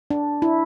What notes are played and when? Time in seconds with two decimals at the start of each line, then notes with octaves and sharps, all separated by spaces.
0.11 D4
0.42 E4